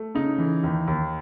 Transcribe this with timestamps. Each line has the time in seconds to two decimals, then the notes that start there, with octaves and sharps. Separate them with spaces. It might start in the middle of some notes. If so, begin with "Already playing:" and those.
Already playing: A3
0.15 C#3 D#4
0.38 E3
0.63 D#2
0.88 D#2